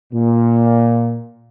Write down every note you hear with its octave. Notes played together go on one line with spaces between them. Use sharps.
A#2